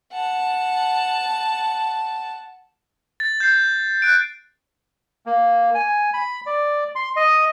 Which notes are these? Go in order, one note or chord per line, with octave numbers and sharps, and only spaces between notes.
F#5 A5
A6
G6 C7
F#6 D7
A#3
G#5
B5
D5
C6
D#5